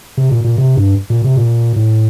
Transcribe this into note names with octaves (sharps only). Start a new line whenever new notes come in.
C3
A#2
A#2
C3
G2
A#2
C3
A#2
A2